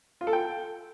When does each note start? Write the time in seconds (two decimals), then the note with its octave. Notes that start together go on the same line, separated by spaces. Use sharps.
0.21 F4
0.27 A4
0.33 G5